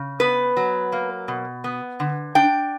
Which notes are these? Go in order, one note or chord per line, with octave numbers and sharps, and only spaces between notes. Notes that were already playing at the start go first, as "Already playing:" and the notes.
Already playing: C#3
B3 B4
F#3
A#3
B2
B3
D3
D4 G5